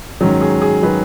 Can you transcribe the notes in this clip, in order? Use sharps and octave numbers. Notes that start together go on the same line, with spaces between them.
G#2 D#3 F#3 C#4
G#4
G#4
D#3 F#3 B4